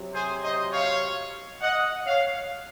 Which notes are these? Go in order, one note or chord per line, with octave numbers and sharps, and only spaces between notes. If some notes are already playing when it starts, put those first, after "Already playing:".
Already playing: C3 F#3
G#4 C5
C5 D#5
C#5 F5
D#5 F#5
C#5 F5